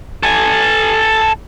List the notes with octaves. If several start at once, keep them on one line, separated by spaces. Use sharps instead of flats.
A4 G#5